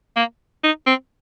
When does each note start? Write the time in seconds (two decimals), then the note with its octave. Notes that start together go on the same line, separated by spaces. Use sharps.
0.16 A#3
0.64 D#4
0.86 C4